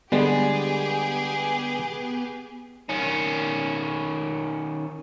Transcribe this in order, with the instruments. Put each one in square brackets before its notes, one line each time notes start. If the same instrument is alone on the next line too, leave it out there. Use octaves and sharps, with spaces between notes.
[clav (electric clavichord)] D3 G3 G#3 [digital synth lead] B3 [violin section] G4 G#4
[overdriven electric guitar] D#3 C#4